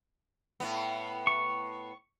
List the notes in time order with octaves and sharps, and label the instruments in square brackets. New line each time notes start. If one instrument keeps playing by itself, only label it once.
[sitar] A2 B3
[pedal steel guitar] C#6